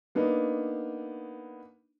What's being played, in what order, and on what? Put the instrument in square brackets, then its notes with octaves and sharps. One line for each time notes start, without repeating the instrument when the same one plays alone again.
[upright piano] A#3 B3 D4 D#4